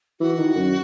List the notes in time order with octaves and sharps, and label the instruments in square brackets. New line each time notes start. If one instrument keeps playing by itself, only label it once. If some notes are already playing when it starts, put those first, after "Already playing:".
[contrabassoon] E3 [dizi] F#4
[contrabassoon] D#3
F#2